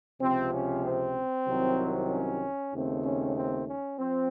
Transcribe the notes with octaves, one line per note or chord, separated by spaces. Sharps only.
C#2 C3 F3 C4
C#4
C4
C2 C3 D#3 F#3
C#4
D#2 C#3 A3 C4
C#4
C4
C#4
F3 C4